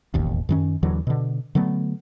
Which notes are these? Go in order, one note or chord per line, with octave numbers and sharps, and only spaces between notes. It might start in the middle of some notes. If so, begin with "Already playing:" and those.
E1 A1 D#2
F#2 D#3 C#4
D#2 D3 E3 F#3
B2 D3
D3 F#3 A3 B3